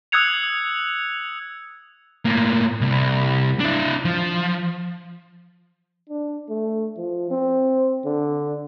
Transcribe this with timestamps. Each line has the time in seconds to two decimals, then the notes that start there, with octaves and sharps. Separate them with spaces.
0.12 D#6 E6 F#6 G#6 C#7 F7
2.25 A2 A#3
2.81 C2
3.60 D4 E4
4.05 F3
6.10 D4
6.49 A3
6.97 F3
7.31 C4
8.05 D3